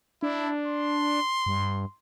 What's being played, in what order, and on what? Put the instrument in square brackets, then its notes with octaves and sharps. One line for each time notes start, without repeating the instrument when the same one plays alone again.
[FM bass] D4 [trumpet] E4
[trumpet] C6
[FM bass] G2